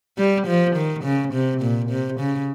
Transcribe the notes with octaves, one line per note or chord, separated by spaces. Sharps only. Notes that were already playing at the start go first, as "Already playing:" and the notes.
G3
F3
D#3
C#3
C3
A#2
C3
C#3